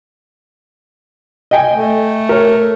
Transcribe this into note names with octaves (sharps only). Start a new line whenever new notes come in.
D#5 G5 G#5
A3
A#4 C#5